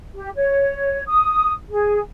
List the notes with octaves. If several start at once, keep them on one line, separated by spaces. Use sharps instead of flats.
G4
C#5
D#6
G#4